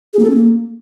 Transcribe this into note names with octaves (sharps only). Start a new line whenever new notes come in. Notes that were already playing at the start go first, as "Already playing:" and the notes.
G#4
A#3
A4
C#4
A#3